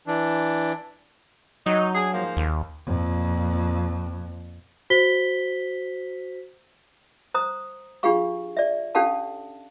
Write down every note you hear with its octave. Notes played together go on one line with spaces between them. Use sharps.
E3 D4
F#3 D#4
D4 G#4
G#2 F3 A#3
D#2
F2 A#2
F#4 C5 B6 G7
C5 A#5 D#6
D4 F4 G4 G#4 F5 C#6
D5 E5
C#4 D4 G4 A4 F5 A5